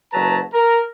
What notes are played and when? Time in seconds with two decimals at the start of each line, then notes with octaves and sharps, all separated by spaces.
0.12 F#1 F#3 B4 A5 A#5
0.53 A#4